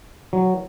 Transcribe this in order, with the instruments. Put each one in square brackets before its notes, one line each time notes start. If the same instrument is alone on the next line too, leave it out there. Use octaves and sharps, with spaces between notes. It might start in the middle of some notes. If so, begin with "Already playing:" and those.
[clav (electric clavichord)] F#3